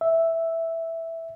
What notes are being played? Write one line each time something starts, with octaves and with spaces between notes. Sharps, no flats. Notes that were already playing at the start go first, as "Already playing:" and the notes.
E5